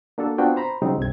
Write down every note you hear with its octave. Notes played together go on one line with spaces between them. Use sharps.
A#3 D4 F#4 A4
B3 C4 D4 F4 F#4 G5
C5 A#5 B5
C#3 F#3 G3 C4 D#4
C2 G2 C3 C4 G#6